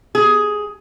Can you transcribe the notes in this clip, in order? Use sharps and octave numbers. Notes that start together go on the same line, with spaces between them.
G#4